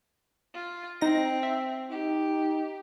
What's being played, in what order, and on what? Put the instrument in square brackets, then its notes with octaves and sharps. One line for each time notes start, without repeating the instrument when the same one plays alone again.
[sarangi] F4
[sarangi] C4 [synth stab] D#4 A#6
[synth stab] E5
[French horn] D#4 [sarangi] G4